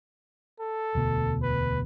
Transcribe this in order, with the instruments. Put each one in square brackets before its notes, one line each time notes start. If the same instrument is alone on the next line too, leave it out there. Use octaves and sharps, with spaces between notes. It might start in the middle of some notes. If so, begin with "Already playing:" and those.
[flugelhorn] A4
[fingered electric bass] E1 D2 B2
[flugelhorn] B4